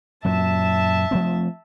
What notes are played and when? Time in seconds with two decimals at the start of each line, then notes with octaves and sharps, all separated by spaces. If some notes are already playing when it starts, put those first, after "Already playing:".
0.25 F#2 A#2 F#3 E5 A5
1.11 F3 A3 C4